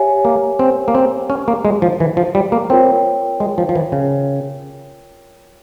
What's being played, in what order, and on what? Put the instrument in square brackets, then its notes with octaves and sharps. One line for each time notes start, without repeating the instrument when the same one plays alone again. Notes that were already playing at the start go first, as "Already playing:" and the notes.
Already playing: [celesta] G4 C#5 E5 G#5
[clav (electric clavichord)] A#3
C4
A#3
C4
C#4
A#3
G#3
F3
E3
F3
G3
A#3
[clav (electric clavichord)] C4 [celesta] F4 A#4 C#5 G5
[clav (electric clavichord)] G#3
F3
F3
E3
C#3